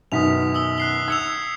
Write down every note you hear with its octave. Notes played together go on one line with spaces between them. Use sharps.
F#2 B2 D#3 D#6 B6 F7
D#6 E6 G7
F#6 C7 G7
E6 G#6 C#7 F7